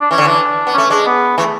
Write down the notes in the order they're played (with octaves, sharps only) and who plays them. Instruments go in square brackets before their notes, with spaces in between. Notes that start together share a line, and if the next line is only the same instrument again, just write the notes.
[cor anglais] D4
[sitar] E3 [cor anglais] C#4
[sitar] D3
[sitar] E3 [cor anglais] D4
[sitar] B3
[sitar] A3 [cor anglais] C#4
[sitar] G#3 [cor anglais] D4
[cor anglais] B3
[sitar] E3 [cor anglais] A3